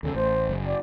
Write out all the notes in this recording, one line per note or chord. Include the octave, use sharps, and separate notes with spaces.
D#2 C#3 A4
A1 C5
F#1
D5